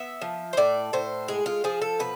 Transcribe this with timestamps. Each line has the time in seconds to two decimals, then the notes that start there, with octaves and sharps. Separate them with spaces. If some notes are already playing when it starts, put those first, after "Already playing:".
Already playing: B3 E5
0.21 F3
0.53 C5
0.57 A2 D5
0.93 A2 C5
1.28 G#3 G#4
1.46 F4
1.64 F3 G#4
1.82 A4
1.99 B2 B4